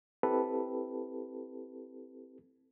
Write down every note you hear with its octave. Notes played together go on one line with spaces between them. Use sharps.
C4 E4 G4 A4 B4